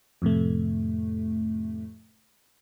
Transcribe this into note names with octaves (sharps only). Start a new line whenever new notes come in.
F2 A2 C3 A3